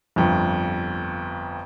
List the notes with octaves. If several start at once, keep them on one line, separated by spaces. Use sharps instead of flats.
G1 F2